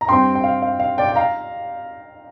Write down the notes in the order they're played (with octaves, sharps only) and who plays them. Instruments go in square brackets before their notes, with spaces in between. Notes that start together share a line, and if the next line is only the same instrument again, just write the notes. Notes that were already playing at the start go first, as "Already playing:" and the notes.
[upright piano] A#5
G2 G3 C4 G5 C6
G5
F5
F5
F5
D5 G5
G5
F5 A#5